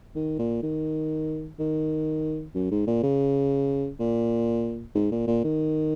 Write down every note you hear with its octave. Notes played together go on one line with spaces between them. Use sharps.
D#3
A#2
D#3
D#3
F#2
G#2
A#2
C#3
A#2
G#2
A#2
A#2
D#3